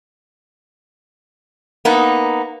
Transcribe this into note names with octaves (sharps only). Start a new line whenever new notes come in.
A#3 B3 D#4